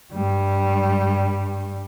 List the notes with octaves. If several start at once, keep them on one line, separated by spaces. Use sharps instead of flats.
G2 G3